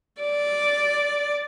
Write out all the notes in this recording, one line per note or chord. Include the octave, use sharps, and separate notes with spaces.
D5